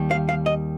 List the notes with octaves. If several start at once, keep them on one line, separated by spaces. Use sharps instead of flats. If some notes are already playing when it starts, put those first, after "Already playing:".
Already playing: D#2 D#3 G3
F5
F5
D#5